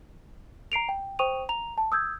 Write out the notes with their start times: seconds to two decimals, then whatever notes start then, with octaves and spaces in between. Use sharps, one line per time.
0.72 A#5 C7 D7 F7
0.89 G5
1.19 C5 G5 C#6 D#6 D#7 F7
1.49 A#5 F7
1.78 A5
1.92 D#6 E6 G6 G#6